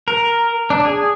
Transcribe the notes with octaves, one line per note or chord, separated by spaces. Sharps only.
A#4
D4
G#4